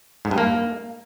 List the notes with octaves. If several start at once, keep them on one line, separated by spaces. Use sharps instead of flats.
G#2
G2
A#3